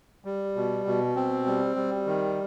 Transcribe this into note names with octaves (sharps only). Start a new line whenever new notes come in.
G3
B2
B2
C4
G3
G3
D#3